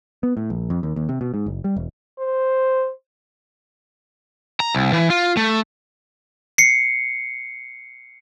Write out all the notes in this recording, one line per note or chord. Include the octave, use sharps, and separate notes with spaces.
B3
A2
A#1
F2
D#2
D#2
C3
B2
G#2
F#1
G3
E1
C5
A#5
C2
E3
F4
A3
C7 C#7